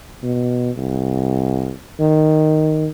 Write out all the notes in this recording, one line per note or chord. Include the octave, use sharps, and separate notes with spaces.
B2
C2
D#3